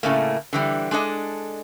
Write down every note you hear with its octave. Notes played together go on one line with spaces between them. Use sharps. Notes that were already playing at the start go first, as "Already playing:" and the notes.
A2 C#3 A3 A#3
D3 E3 G3
G#3 D4 A4 D#5